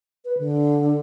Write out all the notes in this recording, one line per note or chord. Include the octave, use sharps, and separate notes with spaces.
B4
D3